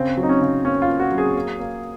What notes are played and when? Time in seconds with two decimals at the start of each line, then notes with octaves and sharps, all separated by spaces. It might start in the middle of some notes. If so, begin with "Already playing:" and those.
Already playing: C#3 C4
0.17 F#3
0.23 D#4
0.29 C#4
0.41 C#3
0.64 A#3 C#4
0.82 F4
0.89 A#3
1.00 F#4
1.12 F#3
1.18 G#4
1.36 A#3
1.59 A#3